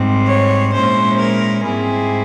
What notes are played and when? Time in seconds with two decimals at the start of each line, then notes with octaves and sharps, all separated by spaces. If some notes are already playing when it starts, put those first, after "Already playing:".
Already playing: G#2 G3 C4
0.27 C#5
0.73 A#2 G#3 C#4 E4 C5
1.19 A#4
1.65 G#2 G3 C4 E4 G#4